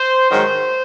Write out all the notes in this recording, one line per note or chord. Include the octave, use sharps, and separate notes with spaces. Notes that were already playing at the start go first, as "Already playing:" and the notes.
Already playing: C5
G#2 D#3 F#3 C5